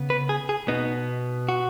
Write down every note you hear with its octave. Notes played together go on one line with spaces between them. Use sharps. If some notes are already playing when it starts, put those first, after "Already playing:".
Already playing: C#3 B3
B4
G#4
G#4
B2 B3 D#4
F#4